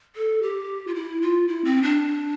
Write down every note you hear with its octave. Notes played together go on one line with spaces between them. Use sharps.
A4
G4
F4
E4
F4
E4
C4
D4